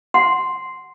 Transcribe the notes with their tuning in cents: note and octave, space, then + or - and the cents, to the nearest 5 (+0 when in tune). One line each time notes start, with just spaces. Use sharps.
F#5 +0 C6 +0